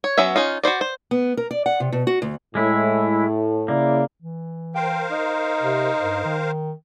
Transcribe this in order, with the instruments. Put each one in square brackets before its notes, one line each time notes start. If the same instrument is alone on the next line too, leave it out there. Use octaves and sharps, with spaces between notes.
[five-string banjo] C#5
F#3 B3 C#4 E5
C#4 D#4 F4
F#4 B4 C5 D5
C5
[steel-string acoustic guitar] B3
A#4
D5
F#5
C3
B2
F#4
D2
[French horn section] A2 [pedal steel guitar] G#3 E4
[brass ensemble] C#3 E4 D5 [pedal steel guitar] A#3
[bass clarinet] E3
[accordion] A#4 C5 F5 [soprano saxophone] G5
[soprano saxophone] D#4
[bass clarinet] C3
G2
D#3